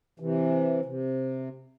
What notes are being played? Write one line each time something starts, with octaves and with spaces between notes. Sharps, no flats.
C3 E3
C3